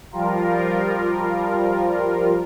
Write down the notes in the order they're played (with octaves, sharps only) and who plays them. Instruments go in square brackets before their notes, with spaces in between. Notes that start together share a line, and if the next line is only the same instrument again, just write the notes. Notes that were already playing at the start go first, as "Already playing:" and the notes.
[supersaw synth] F3 G3 F4 A#4